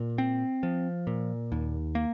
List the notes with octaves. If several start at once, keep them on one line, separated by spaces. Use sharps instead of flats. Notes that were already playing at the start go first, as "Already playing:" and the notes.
Already playing: A#2
C4
F3
A#2
D#2
A#3